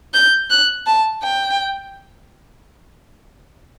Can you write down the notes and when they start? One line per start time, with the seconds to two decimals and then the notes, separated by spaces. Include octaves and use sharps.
0.14 G6
0.50 F#6
0.86 A5
1.23 G5